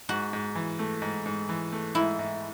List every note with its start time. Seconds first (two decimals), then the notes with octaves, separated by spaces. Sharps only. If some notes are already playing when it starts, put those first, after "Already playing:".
0.09 G#2 F#4
0.33 G#2
0.55 E3
0.79 A3
1.02 G#2
1.26 G#2
1.49 E3
1.73 A3
1.95 G#2 E4
2.19 G#2